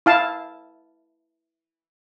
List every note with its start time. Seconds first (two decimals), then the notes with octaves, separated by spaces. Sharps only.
0.06 E4 F5 A5